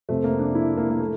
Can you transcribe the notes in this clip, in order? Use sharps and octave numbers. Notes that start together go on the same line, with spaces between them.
F2 C3 F3 A3
A#3
D4
E4
A#3
A#3
A3